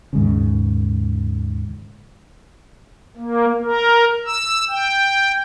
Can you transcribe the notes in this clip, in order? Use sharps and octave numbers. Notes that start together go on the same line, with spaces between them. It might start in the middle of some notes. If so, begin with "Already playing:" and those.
D#2 G#2 C#3
A#3
A#4
E6
G5